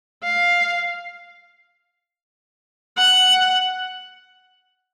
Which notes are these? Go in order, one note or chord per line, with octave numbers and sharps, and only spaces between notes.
F5
F#5